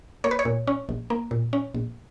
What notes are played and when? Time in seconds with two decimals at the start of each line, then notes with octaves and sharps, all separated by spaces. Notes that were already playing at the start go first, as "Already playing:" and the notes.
0.24 A#3 C#5
0.31 B4
0.39 C#5
0.45 A#2
0.67 C#4
0.89 A#1
1.10 A#3
1.31 A#2
1.53 C#4
1.75 A#1